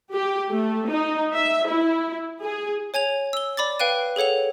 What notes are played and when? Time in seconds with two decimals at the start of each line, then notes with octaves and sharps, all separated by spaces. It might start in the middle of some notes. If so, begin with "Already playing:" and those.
0.13 G4
0.51 A3
0.90 D#4
1.35 E5
1.69 E4
2.42 G#4
2.94 C#5 G#5 G#6 F7
3.33 E6 G7
3.57 D5 B5 D6 A6
3.80 B4 F5 G5 F#6 D#7
4.16 G#4 A4 C#5 F#5 F7